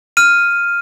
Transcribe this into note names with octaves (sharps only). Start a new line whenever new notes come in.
F6 D#7